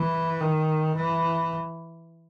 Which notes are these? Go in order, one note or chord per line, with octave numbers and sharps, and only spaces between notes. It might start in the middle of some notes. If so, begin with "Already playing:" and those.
Already playing: E3
D#3
E3